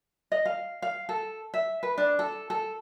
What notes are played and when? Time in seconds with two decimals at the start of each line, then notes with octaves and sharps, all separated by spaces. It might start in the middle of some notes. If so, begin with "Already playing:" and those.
0.32 D#5
0.46 F5
0.82 F5
1.09 A4
1.54 E5
1.83 B4
1.98 D4
2.19 A4
2.50 A4